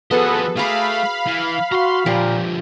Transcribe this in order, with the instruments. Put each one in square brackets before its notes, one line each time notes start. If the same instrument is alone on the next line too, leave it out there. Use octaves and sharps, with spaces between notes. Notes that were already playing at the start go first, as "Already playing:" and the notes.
[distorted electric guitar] F3 D#5 [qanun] B3 F#4 G#4 [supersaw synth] A4 B4
[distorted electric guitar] A3 [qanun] G#4 A#5 D6 [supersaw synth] F5 B5
[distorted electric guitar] E3
[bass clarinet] F#4 [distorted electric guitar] A#5 C6
[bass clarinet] A#2 [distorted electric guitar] D3 F3 [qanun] G4 A#4